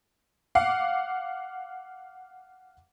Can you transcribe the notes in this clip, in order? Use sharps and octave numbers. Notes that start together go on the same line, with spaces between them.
F5 F#5 D6